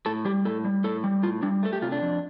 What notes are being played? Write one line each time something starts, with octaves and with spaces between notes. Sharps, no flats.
A2 A4
G3 G4
A2 A4
G3
A2 A4
G3
A2 F4
G3 D4
A3 A4
G4
C3 F4
D4
F2